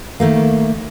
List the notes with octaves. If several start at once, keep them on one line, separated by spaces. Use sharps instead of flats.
D#3 A3 A#3